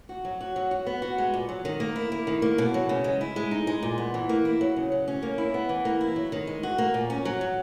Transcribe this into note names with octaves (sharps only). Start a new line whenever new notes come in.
F#4
F#3
F#4
F#3
F#4
B3
F#4
G#3
A#2
F#3
D#3
A#3
E4
A#3
D#3
A#3
B2
F#3
C#3
G#3
E4
G#3
D#4
G#3
A#2
B3
E3
A#3
E4
F#3
C#3
F#3
C#4
A#3
E4
B3
E3
A#3
E4
F#3
D#3
G#3
F#4
A#3
A#2
C#4
F#3
F#3